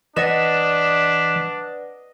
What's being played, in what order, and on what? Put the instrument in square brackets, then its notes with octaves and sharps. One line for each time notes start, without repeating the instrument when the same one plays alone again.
[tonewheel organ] E3 [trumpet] D4 [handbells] B4 D5 F#5 [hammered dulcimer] D#5